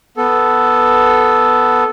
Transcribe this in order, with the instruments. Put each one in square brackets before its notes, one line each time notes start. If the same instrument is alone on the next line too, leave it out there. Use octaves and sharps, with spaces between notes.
[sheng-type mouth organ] B3 A4